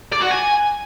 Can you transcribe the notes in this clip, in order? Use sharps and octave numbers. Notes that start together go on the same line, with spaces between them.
D5
F#4
G#5